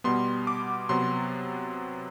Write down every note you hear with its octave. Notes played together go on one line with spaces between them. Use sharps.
B2 G3 B3 C6
D6
C3 F#3 B3 C6